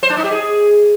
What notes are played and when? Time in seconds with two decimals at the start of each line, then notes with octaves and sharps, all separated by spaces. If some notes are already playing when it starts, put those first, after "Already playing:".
0.03 C5
0.10 D4
0.17 D#4
0.24 G4
0.31 G#4